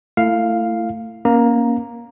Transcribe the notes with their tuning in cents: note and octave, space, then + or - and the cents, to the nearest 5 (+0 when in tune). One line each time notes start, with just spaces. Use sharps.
A3 +25 E4 +20 F5 +0
A#3 +15 C#4 +0 A#5 +5